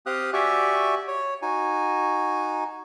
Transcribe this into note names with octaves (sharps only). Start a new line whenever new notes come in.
C4 G4 F5 D#6 F#6
F#4 G4 D5 E5 G#5 C#6
C#5
D#4 F#4 G#5